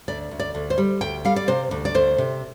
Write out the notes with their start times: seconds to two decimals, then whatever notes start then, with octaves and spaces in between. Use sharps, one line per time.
0.08 D2 D5
0.31 D2
0.39 D5
0.55 D2
0.70 C5
0.78 G3
1.01 D2 G5
1.25 G3 F5
1.36 D5
1.48 C3 C5
1.71 D2
1.85 D5
1.95 D2 C5
2.18 C3